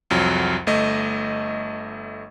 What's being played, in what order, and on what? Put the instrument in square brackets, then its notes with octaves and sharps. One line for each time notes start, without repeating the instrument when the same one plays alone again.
[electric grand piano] C2 F2 F#3
G1 A3 D#5